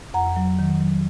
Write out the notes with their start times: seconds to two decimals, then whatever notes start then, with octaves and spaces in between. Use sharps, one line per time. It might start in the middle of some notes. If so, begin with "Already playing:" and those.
0.14 F2 F#5 A#5
0.36 F#3
0.59 D#3
0.81 F#3